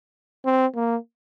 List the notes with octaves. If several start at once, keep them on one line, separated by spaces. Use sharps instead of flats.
C4
A#3